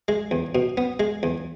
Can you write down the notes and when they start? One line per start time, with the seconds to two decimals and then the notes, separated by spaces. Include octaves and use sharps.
0.08 G#3
0.31 E2
0.55 B2
0.77 B3
1.00 G#3
1.23 E2